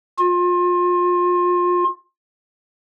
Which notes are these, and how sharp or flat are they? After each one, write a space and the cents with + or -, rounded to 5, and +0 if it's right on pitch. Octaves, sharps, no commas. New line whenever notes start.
F4 +30